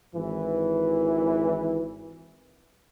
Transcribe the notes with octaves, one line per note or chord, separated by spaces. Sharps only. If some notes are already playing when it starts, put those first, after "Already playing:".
G#1 E3